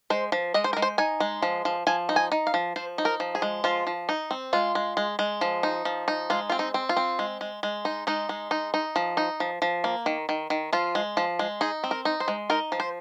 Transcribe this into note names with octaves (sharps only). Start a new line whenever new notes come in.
G#3 C5
F3
G#3 D#5
C5
G#3 A#4
C5
D#4 G#5
G#3
F3
F3
F3 G#5
D#4
G#5
D#4
F5
F3
F3 C5
D#4
A#4
F3
G#4
G#3
F3 F4
F3
D#4
C4
G#3 F4
G#3
G#3
G#3
F3
D#4
F3
D#4
G#3 F4
C4 F4
D#4
C4
F4
C4
G#3
G#3
G#3
D#4
G#3 D#4
G#3
D#4
D#4
F3
D#4
F3
F3
A#3
D#3
D#3
D#3
F3 F4
G#3
F3
G#3
D#4 G#4
C4
A#4
D#4
C5
G#3
D#4 A#4
F3
C5